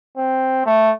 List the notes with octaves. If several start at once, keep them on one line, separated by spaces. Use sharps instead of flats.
C4
A3